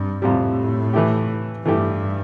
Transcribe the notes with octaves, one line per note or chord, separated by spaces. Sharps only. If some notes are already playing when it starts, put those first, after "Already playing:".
Already playing: G2 C3
F2 A2 C3 G3
E3 A3 E4 G4
G2 E3 A3 E4 G4